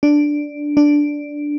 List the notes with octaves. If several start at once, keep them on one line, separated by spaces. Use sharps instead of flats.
D4
D4